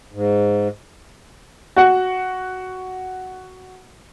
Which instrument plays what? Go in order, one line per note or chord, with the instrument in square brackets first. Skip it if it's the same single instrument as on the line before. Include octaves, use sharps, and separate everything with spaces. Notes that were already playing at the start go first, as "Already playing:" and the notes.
[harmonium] G#2
[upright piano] F#4 F#5